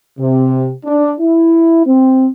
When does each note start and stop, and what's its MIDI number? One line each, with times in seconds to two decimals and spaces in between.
0.19 0.71 48
0.85 1.13 62
1.20 1.84 64
1.86 2.27 60